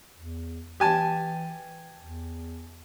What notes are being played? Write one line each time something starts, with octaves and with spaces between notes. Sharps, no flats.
E2
E3 G4 G#5 A5
E2